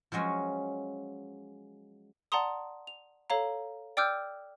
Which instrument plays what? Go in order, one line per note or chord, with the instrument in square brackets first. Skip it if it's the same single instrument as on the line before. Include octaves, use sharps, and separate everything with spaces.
[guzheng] F3 F#3 G#3 C#4
[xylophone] D5 F#5 A5 A#5 C6 D#6
F7
A4 C#5 F5 A#5
D5 G5 D6 E6 F6 G6